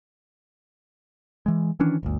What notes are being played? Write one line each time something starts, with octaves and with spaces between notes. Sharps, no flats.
E3 G#3
D#3 E3 C#4 D4
G1 D2